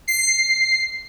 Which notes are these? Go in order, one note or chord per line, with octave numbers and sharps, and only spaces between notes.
C7